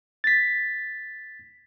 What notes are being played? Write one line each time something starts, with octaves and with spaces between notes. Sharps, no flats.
A6 B6